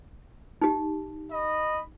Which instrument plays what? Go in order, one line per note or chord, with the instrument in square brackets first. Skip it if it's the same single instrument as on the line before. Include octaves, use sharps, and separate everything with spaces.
[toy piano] D#4 G4
[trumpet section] D#5 B5